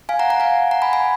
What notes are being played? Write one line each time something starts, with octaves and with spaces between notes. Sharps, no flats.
F5 G#5
F#5 A#5
F#5 A#5
F5 G#5
F#5 A#5
G#5 B5
G#5 B5